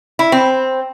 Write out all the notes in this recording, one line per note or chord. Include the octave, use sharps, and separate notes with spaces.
E4
C4